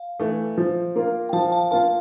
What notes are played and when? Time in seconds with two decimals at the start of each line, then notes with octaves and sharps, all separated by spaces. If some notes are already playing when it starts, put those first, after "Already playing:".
Already playing: F5
0.20 E3 A3
0.58 F3
0.95 A#3 F4 A#4
1.29 G5
1.33 F3 F5 A5
1.52 F5 A5
1.71 A#3 F4 A#4 F5 A5